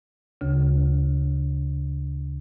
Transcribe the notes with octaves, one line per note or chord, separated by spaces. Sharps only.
D2 C#3